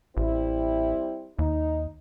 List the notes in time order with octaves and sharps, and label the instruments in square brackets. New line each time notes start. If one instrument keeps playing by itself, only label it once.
[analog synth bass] A1 [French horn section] G3 C4 E4
[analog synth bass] D#2 [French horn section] D#4